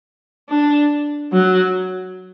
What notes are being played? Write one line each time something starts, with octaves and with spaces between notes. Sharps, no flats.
D4
F#3